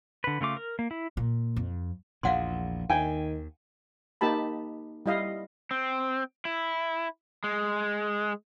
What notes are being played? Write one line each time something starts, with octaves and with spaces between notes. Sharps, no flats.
D3 B4
C#3 A3 F4 D6
A#4
A#3
E4
A#2
F2
A#1 E2 A#2 F5 F#5 C6
D#2 D#3 G5 G#5
A#3 D#4 G4 A5 B5
G3 E4 D#5 F5
C4
E4
G#3